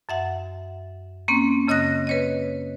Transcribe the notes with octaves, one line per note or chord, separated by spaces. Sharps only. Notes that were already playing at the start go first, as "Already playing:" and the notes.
F#2 E5 F#5
A#3 C4 C#4
F#2 C#3 D#5 D#6 F#6 A#6
B4 C#5 D#5